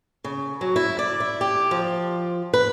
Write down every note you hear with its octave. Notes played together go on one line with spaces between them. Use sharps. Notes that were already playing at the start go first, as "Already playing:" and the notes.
C#3
F#3
E4
D5
E4
G4
F3
B4